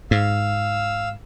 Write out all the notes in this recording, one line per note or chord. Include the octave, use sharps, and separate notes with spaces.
G#2 F5 E6